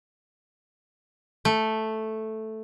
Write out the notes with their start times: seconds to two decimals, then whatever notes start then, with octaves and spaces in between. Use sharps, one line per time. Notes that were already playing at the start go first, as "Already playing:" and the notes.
1.45 A3